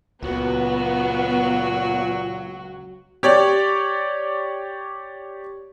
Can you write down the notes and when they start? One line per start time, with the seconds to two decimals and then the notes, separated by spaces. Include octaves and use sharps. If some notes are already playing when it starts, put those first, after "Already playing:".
0.23 C#2 A#2 F#3 B3 F#4
3.23 G4 C#5 D5